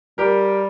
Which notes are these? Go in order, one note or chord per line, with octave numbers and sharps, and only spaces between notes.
G3 G4 A#4